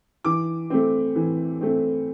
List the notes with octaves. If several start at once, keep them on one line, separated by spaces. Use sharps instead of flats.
E3 D6
A3 C4
E3
A3 C4